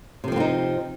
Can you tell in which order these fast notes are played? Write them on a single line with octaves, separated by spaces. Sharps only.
C3 F3 C4 B3 D#4